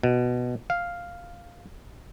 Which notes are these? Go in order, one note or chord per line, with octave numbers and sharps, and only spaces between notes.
B2
F5